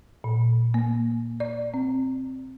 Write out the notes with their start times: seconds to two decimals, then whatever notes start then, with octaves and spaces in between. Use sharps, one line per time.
0.24 A#2
0.74 A#3
1.40 D5
1.74 C4